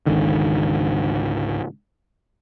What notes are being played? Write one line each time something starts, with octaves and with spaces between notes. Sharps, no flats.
G#1 C#2 D3 D#3